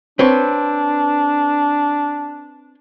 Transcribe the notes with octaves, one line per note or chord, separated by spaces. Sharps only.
C4 D4 B4 C#5